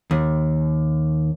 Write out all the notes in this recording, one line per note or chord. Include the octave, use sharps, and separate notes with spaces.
D#2